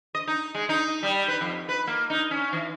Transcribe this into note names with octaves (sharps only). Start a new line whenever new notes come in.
D#5
D#4
G#3
D#4
G3
B4
F2
B4
A#3
D#4
C#4
E3